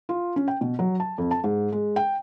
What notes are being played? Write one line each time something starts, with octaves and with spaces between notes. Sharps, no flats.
F4
C#4
G5
B2
F#3
A5
F2
A5
G#2
G#3
G5